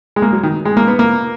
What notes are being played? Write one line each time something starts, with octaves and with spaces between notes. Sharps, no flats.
G#3
A#3
F#3
D#3
G#3
A#3
B3
A#3